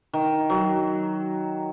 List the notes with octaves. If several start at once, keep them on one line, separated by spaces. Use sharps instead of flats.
D#3
F#3